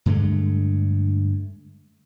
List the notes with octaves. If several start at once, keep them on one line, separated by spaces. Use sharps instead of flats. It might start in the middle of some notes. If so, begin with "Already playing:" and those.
G2 D3 G#3 A3